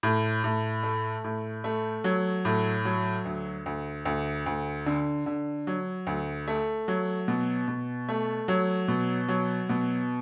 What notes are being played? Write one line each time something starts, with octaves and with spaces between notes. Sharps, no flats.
A2
A2
A3
A2
A3
F#3
A2
F#3
D2
D2
D2
D2
D3
D3
F#3
D2
A3
F#3
B2
B2
A3
F#3
B2
F#3
B2